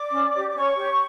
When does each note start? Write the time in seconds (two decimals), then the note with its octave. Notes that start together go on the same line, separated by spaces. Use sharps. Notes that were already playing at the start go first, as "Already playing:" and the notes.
Already playing: D5 D6
0.11 C#4
0.33 G4 C#5
0.47 D6
0.55 C#4 C#5 C#6
0.77 G4 C#5